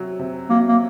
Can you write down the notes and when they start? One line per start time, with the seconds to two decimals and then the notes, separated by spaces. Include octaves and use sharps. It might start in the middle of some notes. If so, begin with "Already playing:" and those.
Already playing: C3 F#3
0.19 C3
0.50 F#3 A#3
0.68 A#3